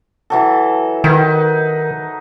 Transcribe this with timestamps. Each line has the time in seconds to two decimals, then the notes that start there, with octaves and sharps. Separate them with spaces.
0.30 E3 F#3 A4
1.04 D#3 D#4 B4